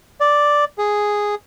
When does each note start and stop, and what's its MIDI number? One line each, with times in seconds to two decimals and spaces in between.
0.21 0.65 74
0.78 1.35 68